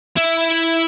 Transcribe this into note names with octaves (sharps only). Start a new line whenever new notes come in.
E4